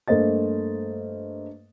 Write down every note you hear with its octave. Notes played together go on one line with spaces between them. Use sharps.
G2 A3 A#3 C5 D#5 A6